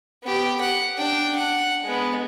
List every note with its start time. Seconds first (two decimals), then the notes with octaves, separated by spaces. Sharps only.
0.23 B3 G4
0.61 F#5
0.98 D4 G5
1.35 F#5
1.84 G#3 B3